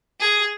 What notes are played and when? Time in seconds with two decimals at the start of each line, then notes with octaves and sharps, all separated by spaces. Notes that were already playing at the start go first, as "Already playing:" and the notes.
0.20 G#4